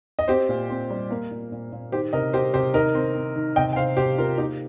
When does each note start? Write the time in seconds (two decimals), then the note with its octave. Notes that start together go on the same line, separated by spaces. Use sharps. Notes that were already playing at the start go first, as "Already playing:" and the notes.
0.19 D#5
0.28 C4 G4 C5
0.49 A#2
0.70 C4
0.90 G3
1.11 A#3
1.31 A#2
1.52 A#2
1.72 A#2
1.92 D#3 G4 C5
2.13 C3 A#4 D#5
2.33 C4 G4 C5
2.54 C3 G4 C5
2.74 D#3 A#4 D#5
2.95 C4
3.15 C4
3.36 D#3
3.56 C3 D#5 G5
3.73 G5
3.76 C3 C5 F5
3.97 C3 G4 C5
4.18 C4 F4 A#4
4.38 A#3 D#4 G4